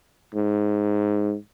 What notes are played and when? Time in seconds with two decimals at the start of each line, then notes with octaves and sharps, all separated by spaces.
0.35 G#2